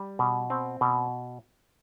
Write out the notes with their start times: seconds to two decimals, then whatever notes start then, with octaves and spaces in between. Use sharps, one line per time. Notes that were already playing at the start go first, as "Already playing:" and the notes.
Already playing: G3
0.19 B2
0.50 C4
0.81 B2